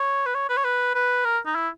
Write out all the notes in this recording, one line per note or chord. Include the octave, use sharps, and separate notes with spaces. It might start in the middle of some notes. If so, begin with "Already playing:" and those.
Already playing: C#5
B4
C#5
B4
C#5
B4
B4
A#4
D#4
E4